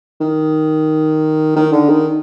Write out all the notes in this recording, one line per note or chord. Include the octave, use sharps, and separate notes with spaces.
D#3
D#3
D3
D#3